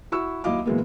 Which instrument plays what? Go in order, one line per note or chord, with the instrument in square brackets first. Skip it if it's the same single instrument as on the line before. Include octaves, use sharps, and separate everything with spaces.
[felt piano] E4 F#4 C#6 E6
D#2 F#3 E4 D#5 F5 D6
A#2 E3 F#3 G#3 A#3 B3